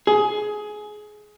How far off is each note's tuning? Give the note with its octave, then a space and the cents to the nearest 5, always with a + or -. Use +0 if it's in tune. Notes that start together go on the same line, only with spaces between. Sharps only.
G#4 +20